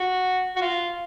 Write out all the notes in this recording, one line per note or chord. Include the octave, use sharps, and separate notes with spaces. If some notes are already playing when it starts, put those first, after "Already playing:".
Already playing: F#4
F#4
F4